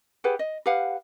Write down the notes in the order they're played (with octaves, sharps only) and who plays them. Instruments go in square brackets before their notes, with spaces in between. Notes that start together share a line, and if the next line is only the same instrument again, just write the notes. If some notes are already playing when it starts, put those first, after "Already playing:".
[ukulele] G4 G#4 B4 F#5
D#5
G4 B4 F5 F#5